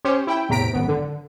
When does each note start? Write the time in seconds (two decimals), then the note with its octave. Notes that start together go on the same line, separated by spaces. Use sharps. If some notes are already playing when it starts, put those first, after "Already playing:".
0.05 C#4 G4 C5 C#5
0.27 E4 G5
0.49 E2 A2 C3 A#5 B6 D7
0.73 G#1 F#2 B3
0.88 D3